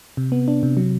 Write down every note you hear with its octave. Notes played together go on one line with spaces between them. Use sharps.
C3
B3
D4
C3
F#3